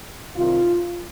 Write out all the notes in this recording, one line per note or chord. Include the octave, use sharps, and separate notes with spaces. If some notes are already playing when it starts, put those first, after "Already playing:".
C2 C3 D#3 F4